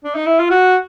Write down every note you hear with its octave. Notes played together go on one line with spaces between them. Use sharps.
D4
D#4
E4
F4
F#4